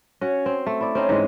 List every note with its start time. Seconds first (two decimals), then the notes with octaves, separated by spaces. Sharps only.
0.21 C#4 F#4 C#5
0.46 C4
0.67 A3
0.81 E4 D5
0.95 C4 C#4 D#4
1.09 G#2 E3 G#3